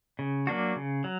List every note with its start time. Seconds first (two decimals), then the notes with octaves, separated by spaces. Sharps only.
0.19 C#3
0.47 F#3 A#3 D4 F#4
0.76 C#3
1.04 F#3